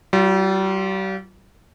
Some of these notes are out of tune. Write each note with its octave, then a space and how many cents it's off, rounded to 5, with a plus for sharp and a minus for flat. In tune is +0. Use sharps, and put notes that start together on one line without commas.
G3 -40 F4 +10